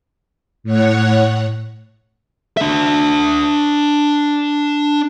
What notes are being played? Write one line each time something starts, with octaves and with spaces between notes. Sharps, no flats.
A2 C#5 F#5
D4 E5